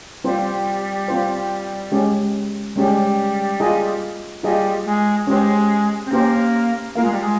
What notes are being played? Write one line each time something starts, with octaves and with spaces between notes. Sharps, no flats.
G3 C4 F4 C5
C4 F4 C5
G#3 C#4 G4
G3 G#3 C#4 G4
F4 G#4 D#5
G3 F4 G#4 D#5
G#3
G#3 C#4 G4 C5
C4
A#3 C#4 G4 C5
A#3 F4 A#4 F5
G#3
G3
G#3